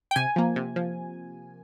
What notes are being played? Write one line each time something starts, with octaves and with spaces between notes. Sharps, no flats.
G5
C3 G#5
F3 A#3
C3
F3